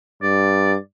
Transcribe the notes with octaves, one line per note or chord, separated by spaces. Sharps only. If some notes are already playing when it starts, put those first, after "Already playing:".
G2 D5